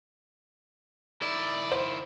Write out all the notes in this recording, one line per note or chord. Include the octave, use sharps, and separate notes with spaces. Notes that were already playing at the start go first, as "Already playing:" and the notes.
D#3 E4 D5
C5